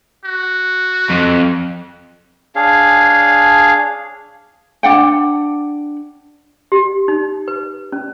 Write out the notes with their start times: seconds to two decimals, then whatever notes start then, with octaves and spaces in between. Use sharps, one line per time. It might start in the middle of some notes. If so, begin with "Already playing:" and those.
0.25 F#4
1.10 F2
2.56 D4 G#4 C#5 F5
4.83 D4 F#5 G5
6.72 G4
7.08 D#4
7.48 B4
7.92 C#4